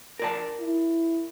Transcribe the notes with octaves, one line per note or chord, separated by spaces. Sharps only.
A#4 D5 A5
E4